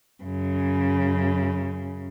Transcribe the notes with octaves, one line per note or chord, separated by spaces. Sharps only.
F#2 C#3